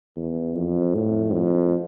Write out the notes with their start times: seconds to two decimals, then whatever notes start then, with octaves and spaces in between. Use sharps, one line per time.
0.17 E2
0.55 F2
0.95 A2
1.33 F2